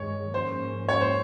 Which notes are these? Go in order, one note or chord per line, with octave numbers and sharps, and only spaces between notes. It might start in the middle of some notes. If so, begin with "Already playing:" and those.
Already playing: G2 D#3 G#3 C#5
G#2 F3 A#3 C#4 C5
C#5
C5